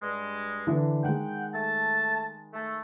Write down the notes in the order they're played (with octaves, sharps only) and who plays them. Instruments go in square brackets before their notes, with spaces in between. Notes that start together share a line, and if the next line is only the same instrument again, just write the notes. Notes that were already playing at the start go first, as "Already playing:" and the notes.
[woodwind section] G2 G#3
[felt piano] D3 E3 D4
[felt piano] D#3 G#3 [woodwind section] F#5 G5
[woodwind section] A3 A5
A3